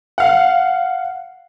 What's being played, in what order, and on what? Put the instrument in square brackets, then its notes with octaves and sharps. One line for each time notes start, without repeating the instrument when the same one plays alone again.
[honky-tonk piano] F5 F#5